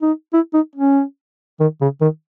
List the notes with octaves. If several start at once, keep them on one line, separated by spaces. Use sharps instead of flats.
D#4
E4
D#4
C#4
D#3
C#3
D#3